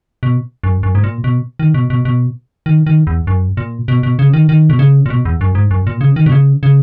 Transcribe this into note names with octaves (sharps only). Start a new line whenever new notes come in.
B2
F#2
F#2
G#2
A#2
B2
D#3
B2
B2
B2
D#3
D#3
E2
F#2
A#2
B2
B2
C#3
D#3
D#3
B2
C#3
A#2
B2
E2
F#2
G#2
F#2
A#2
C#3
D#3
B2
C#3
C#3